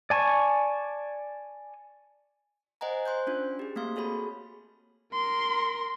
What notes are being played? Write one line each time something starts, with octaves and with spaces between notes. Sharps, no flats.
D5 G#5 A5 C#6
C5 D#5 F#5 G#5 A#5
C5 C6 F#6 G6
C#4 D4 F4
G4 G#4
A3 A#3 C4 F5 C6
F#4 G#4 A4 C#5 B5
A#4 C6